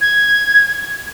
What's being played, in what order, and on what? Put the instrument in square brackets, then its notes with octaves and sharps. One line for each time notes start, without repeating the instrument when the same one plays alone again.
[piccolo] G#6